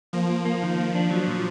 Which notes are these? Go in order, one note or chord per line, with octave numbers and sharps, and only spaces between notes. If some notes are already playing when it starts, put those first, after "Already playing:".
F3 A#3
A#3
A#3
D#3
A#3
D4
F#3
A#2